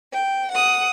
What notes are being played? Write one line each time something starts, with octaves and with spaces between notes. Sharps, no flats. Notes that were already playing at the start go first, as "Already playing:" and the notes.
G5
F#5 D#6